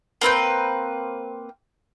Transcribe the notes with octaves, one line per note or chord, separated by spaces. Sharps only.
A#3 C4 B4 G5